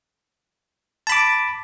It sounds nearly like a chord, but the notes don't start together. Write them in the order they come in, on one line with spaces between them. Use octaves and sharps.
A5 B5 D6